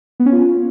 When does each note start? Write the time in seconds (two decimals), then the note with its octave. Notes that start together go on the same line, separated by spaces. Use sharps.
0.20 B3
0.26 C#4
0.32 F4